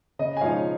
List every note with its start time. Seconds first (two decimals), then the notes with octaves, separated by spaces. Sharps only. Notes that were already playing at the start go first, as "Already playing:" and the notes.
0.19 C#3 D#5
0.37 G#5
0.41 F3 G#3 D#4 C#5 F5